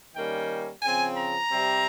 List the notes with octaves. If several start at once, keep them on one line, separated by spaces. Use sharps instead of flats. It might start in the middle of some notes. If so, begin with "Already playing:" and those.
D#3 G3 A#3 C#4 G5
C#3 F3 C4 G#5
A#5
C3 G3 C4